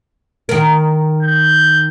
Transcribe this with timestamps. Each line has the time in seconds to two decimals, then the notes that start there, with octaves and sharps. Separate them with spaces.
0.49 D#3 A#4
1.23 G6